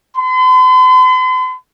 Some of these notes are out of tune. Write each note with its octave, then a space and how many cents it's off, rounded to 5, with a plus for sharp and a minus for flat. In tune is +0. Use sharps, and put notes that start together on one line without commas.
C6 -45